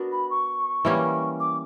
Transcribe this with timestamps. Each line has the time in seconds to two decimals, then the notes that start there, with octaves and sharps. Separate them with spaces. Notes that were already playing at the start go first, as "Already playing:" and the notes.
Already playing: B3 D4 F#4 A#4
0.12 B5
0.30 C#6
0.85 E3 G3 A#3 C#4
1.40 D6